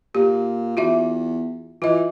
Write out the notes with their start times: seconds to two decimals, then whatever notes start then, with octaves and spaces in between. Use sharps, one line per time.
0.15 A#2 G4
0.77 E2 F4 F#4 E5
1.82 E3 F4 D#5